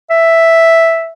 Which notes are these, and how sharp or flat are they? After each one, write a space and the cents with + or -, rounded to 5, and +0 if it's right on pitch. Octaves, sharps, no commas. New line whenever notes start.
E5 +0